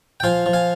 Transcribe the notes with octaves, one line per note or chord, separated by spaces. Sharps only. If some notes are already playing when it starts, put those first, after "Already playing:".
G5
F3 F5 G#5
F3
F5 G#5